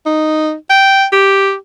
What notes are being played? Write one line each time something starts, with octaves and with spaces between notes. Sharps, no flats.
D#4
G5
G4